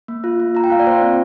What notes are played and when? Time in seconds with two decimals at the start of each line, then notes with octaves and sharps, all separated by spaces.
0.08 A#3
0.24 F4
0.40 A#3
0.55 F4 A#5
0.64 G5
0.70 A#3 F5
0.79 D5
0.86 F4 C5
1.01 C4